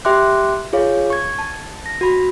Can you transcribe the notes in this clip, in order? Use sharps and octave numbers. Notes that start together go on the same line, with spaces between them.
G4 E5 G5 C6 D6 F#6
F4 G#4 C#5 F5
C#6 G#6
A5
A#6
F#4 B5